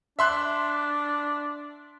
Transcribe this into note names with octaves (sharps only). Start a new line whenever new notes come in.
D4 E5 C6 F#6